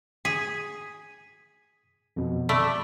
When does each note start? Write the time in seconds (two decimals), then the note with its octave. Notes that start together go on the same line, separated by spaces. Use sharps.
0.25 G#4 B6
2.16 F2 B2
2.49 A3 D5 B5 D6